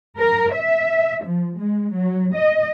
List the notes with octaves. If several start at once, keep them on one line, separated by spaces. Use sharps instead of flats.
A#4
E5
F3
G#3
F#3
D#5